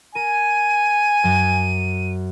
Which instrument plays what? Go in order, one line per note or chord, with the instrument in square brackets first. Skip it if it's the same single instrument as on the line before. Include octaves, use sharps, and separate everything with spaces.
[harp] A#4 [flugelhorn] G#5 [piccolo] D#7
[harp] F#2 F#3 B6